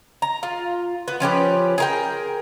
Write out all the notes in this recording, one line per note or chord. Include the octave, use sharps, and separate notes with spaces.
A#5
F4
B3
F3 C#4 G4 B4
G#4 A#4 G5